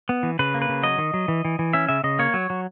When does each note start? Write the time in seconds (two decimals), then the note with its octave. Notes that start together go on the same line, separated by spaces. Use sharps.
0.09 B3
0.23 E3
0.39 C#3 B4
0.54 A#3
0.62 B4
0.69 C#3
0.83 F#3 D#5
0.98 D#3
1.14 F#3
1.28 E3
1.45 E3
1.59 E3
1.73 C#4 E5
1.89 C#3 E5
2.04 C#3 D#5
2.19 A#3 C#5
2.34 F#3
2.50 F#3